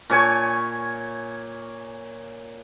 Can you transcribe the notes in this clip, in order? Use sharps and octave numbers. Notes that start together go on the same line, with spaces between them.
A#2 C#5 G#5 C#6